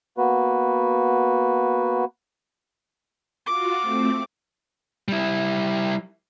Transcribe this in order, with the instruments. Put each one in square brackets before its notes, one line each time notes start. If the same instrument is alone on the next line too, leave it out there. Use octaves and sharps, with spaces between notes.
[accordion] A#3 B3 F#4 B4
[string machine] F4 F#4 [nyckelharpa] D6
[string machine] A3 C4
[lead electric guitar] G3 E4